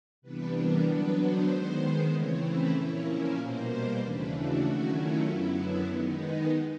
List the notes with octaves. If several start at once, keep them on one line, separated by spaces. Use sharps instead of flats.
C3 E3 G3 B3 D4 B4
A#4
D3 F#3 B3 D4 B4
C5
D#3 G#3 B3
C#3 E3 A3 C4 E4 C#5
B4
A#2 F3 A#3 C#4 E4 C#5
B2 G3 A#3 C5
D#2 C#3 E3 A3 D4 B4
F#4
D#3 F#3 A3 C#4 E4
F4
F#2 D3 F#3 B3 E4
D#3 G#3 B3 D#4